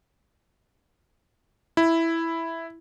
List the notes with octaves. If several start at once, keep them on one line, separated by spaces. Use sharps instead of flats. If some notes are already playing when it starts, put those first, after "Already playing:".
E4